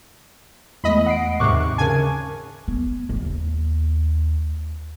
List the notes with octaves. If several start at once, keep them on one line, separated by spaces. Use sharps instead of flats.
E2 G#3 A3 D#5 B5
F#5 C7 D7
D#2 G#2 C3 C#6 D6 F#6
C#3 A#4 G#5 A5
B3
D#2